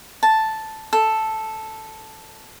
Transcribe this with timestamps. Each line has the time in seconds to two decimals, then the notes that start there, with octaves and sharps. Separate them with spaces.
0.23 A5
0.93 A4